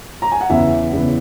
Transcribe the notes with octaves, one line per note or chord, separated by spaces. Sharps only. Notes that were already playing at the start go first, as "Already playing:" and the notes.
A#5
G#5
F#5
E2 C#3 E3 B3 E5
E2 C#3 E3 B3